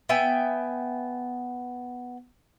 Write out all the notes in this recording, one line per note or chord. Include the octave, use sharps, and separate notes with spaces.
B3 E5 G5 G#5